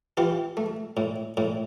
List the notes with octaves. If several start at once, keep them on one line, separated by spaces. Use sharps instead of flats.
E3 F4 G4
A3
A2
A2